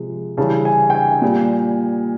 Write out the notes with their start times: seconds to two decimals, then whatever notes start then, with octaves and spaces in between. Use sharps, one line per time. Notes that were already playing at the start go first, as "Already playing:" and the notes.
Already playing: C3 F3 G#3
0.37 C#3 E3 G3 A5
0.65 G#5
0.90 G5
0.95 G#5
1.22 A#2 G3